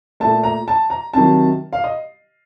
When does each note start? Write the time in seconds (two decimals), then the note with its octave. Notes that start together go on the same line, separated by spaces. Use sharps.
0.20 A#2 A3 A5
0.43 A#5
0.68 A5
0.90 A#5
1.14 C3 D#3 F#3 A5
1.73 F5
1.84 D#5